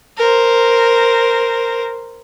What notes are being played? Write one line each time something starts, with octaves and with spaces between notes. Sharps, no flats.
A#4 C5